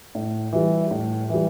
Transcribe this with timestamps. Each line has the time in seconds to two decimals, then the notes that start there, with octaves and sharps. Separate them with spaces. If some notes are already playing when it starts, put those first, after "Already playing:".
0.15 A2
0.53 E3 G3
0.91 A2
1.29 E3 G3